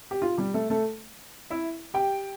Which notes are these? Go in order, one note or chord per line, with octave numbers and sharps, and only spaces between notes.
G4
F4
G3 G4
A3 A4
A3 A4
E4 E5
G4 G5